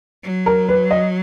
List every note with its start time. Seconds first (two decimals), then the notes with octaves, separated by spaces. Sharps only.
0.23 F#3
0.46 A#4
0.69 B4
0.91 D#5